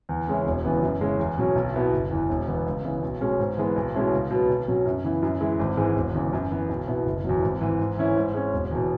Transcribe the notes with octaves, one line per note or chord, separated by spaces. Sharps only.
E2
C#3 G#3 C#4 E4
E1
E2 C#3 E3 B3
F#2
C#3 G#3 C#4 E4
E2
B2 F#3 C#4
B1
B2 B3 E4
F#1
E2 E3
E1
E2 E3 B3
C#2
C#3 E3 B3
B1
B2 G#3 C#4
G#2
E3 G#3 B3
B1
B2 G#3 C#4 E4
C#2
B2 F#3 B3
B1
B2 F#3 C#4
F#2
C#3 E3 B3 E4
F#2
E3 G#3 E4
G#1
G#2 E3 G#3
E1
E2 C#3
F#2
E3 B3
B1
B2 B3 E4
F#1
E2 B2 F#3
G#1
G#2 E3
G#2
E3 C#4 E4
G#2
G#3 C#4
E1
E2 B2